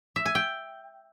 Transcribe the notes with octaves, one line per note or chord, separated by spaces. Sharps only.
E5
G#5
G5